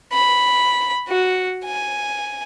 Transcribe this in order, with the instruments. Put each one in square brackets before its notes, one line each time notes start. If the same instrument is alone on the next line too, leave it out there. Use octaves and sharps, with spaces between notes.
[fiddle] B5
F#4
G#5